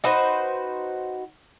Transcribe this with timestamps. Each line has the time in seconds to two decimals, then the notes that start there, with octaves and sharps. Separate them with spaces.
0.04 D#4 F#4 B4 C5